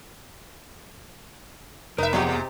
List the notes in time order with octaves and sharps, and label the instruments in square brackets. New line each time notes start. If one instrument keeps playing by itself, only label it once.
[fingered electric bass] F1 [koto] D#4 [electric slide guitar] A#4 [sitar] B4 E5
[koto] C3 D#4 G4 [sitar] F3 [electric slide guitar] B3 G#4 F#5
[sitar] A#2